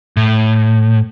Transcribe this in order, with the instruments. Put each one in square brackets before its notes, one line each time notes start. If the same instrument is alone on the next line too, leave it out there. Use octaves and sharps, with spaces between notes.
[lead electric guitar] A2